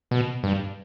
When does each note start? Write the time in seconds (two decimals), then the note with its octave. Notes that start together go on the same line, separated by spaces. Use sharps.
0.11 B2
0.43 G2